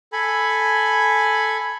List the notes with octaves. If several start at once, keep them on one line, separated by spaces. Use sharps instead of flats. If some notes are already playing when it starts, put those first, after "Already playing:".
A4 G#5 B5